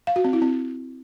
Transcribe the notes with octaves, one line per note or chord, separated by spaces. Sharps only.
F5
F#4
C4
E4
C4